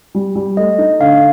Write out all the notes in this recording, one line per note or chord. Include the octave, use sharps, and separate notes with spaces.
G3
G3
A3 D#5
D#4
D3 F5